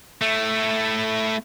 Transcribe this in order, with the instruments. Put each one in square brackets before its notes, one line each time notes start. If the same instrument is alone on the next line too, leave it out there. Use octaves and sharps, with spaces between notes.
[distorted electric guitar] A3 E4